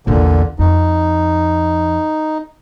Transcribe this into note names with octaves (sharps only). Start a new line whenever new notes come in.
A#1 E2 A#2 D3
F2 D#4